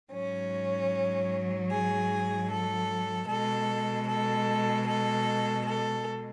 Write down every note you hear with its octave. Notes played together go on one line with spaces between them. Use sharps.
G#2 F#3 C#4
G#4
A4
B2 G#3 A4
A4
A4
A4